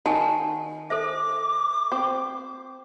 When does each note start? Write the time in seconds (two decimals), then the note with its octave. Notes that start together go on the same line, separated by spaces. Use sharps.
0.06 D#3 F#5 G#5 A5
0.90 A4 C5 E5 D6
1.92 C4